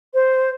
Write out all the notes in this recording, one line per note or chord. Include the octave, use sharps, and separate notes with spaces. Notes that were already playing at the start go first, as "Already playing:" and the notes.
C5